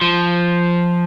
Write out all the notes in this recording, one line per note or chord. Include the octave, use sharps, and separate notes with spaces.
F3